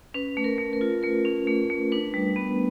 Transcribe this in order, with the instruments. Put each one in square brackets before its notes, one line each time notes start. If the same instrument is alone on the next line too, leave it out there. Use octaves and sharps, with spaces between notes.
[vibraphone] C#4 B4
A3
A#4
A3
A#4
F4
A3 A#4
C#4
A3
A3
D4 B4
G3
B3